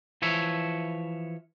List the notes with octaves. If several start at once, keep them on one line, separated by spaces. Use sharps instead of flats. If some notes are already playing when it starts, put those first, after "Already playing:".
E3 F3 C#5 E5